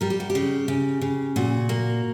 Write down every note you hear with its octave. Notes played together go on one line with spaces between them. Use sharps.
G3 A#4
G4
F#4
G4
C#3
C#3
C#3
A#2 F#4
A#3